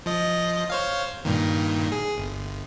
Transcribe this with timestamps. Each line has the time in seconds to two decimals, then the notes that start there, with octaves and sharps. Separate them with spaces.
0.06 F3 D#5
0.70 C5 C#5 F5
1.25 G2 A#2 D#3
1.92 G#4
2.18 G1